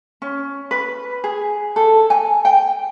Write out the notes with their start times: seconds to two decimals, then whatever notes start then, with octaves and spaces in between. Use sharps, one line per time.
0.22 C#4
0.71 B4
1.24 G#4
1.76 A4
2.10 G#5
2.45 G5